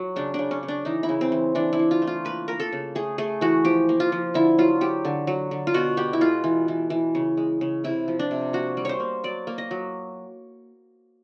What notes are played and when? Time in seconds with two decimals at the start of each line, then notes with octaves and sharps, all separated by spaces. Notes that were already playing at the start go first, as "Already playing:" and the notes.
Already playing: F#3
0.16 C#3 D4
0.34 C#3 D4
0.51 C#4
0.63 C#3
0.68 D4
0.85 E3 D#4
1.03 E4
1.09 C#3
1.21 C4
1.32 E3
1.55 E3 D4
1.73 E4
1.79 E3
1.91 F4
2.02 A3
2.07 F4
2.25 A#3 B4
2.48 A#3 A#4
2.60 A4
2.72 C#3
2.95 A3 G#4
3.18 A3 G#4
3.41 E3 F#4
3.65 F3 G4
3.89 A#3
4.00 F4
4.12 F3
4.34 D3 E4
4.58 F#3 F4
4.81 F#3 G4
5.05 D3
5.27 F#3
5.51 D3
5.67 F4
5.74 B2 F#4
5.97 B3 G4
6.13 E4
6.21 G#3 F4
6.44 E3
6.68 E3
6.90 E3
7.15 C#3
7.37 G#3
7.61 C#3
7.84 C3 E4
8.08 F3
8.19 D4
8.31 C3
8.53 A#3 F#4
8.77 G3
8.85 C5 C#5
9.00 A#3
9.24 F#3 D5
9.47 A#3
9.58 D#5
9.71 F#3